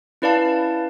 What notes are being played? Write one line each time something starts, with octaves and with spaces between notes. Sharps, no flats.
C#4 E4 B4 D5 F5 A5